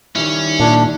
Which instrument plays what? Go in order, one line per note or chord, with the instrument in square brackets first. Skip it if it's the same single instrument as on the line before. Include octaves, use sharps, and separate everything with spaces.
[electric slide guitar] D#3 G3 E4 [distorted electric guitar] C#4
[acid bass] A#2 [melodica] D4